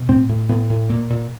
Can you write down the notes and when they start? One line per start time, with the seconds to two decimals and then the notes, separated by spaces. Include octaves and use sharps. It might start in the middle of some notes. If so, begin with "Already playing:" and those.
Already playing: B2
0.09 A2 C4
0.29 A2
0.49 A2 B3
0.69 A2
0.89 A#2 A#3
1.10 A#2